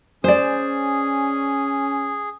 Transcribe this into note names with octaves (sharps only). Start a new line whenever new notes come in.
C#4 G#4 C5 D5